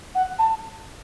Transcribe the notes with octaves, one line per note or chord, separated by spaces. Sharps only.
F#5
A5